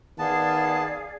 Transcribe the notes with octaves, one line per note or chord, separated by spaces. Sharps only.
D#3 B3 G#4 D5 F5 A5